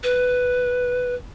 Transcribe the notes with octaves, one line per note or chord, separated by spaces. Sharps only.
B4